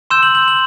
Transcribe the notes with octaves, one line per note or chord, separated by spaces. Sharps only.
C6 E6 G6 E7
F#7
F#7
F#7